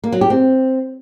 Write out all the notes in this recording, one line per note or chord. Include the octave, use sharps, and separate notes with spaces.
A#3
F#3
G4
C4